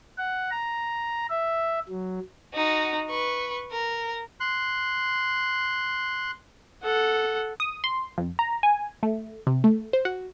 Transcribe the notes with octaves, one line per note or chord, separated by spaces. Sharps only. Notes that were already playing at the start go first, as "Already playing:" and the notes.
F#5
A#5
E5
F#3
D#4 F#4
B4 C#6
A#4
C6 F#6
A4 F#5
D#6
C6
F2
A#5
G#5
A3
C3
A3
C5
F#4